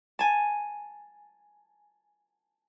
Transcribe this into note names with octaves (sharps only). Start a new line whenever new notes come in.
G#5 A5